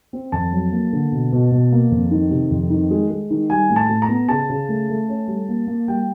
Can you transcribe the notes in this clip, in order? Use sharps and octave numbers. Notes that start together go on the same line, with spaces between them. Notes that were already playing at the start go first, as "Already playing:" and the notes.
C4
F2 A5
F#3
A#3
D3
B2
B2
B2
A#3
F2
D#3
C3
F2
D#3
G#3
G#3
D#3
G3 G#5
A2
A5
A2
A#5
B3
C#3 A5
C#3
A3
A3
C#4
G3
A#3
A#3
G3 G5